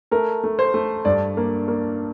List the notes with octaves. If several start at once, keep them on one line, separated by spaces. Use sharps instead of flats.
A3 A#4
A3
C5
A3
G2 D5
A#3
A#3